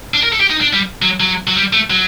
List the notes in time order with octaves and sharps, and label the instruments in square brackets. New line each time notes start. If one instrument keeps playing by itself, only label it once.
[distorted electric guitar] D4
A#4
A4
G4
D#4
D4
G3
F#3
F#3
F#3
G3
A3
F#3